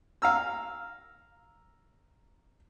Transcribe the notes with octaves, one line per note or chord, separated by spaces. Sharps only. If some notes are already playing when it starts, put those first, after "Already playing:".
F5 A#5 E6